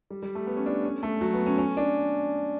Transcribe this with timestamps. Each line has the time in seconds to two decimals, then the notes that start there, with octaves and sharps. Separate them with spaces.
0.10 G3
0.23 G3
0.35 A3
0.47 B3
0.57 C#4
0.66 D4
0.84 C#4
1.03 A3
1.21 F#3
1.34 B3
1.46 C#4
1.58 C#4
1.77 D4